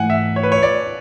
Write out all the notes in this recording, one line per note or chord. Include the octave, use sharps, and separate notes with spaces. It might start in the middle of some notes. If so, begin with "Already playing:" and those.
Already playing: G#2 E3 A3 E4 F#5 G#5
E5
C#5
B4
C#5
D5